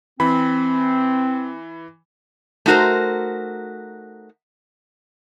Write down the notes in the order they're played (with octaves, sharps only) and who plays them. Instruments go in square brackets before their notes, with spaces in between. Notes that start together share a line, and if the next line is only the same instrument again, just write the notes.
[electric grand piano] E3 B5 [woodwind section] C4
[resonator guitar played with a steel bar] A3 D#4 F#4 A#4 C5